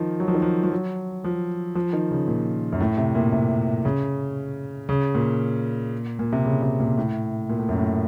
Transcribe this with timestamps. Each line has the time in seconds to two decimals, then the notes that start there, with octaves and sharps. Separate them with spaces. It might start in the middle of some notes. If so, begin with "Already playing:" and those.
Already playing: D#3 F3
0.20 F#3
0.28 F3
0.34 D#3
0.42 F3
0.63 F3
0.72 F#3
1.24 F3
1.75 F3
1.93 D#3
2.11 C#3
2.27 A#2
2.72 F#2
2.80 A2
2.97 C3
3.15 A#2
3.32 C3
3.85 C#3
4.89 C#3
5.15 A#2
6.19 A#2
6.32 C3
6.45 C#3
6.62 C3
6.80 A#2
6.97 A2
7.49 A#2
7.59 A2
7.69 F#2
7.78 A2